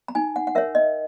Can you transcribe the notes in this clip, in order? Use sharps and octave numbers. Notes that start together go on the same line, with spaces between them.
A#5
D#4 G#5
F#5
F#5
A#4 C#5 E5
D#5